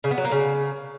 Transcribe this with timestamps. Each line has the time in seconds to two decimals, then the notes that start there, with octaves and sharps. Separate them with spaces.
0.04 C#3
0.11 B3
0.18 F#3
0.25 A#3
0.31 C#3